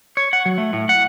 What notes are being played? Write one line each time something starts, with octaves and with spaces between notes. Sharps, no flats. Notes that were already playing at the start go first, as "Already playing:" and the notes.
C#5
F#5
F#3
A3
A2
F#5